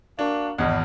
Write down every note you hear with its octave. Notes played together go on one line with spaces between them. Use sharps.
A#3 D4 F#4 A#4
G#1 E2 D#5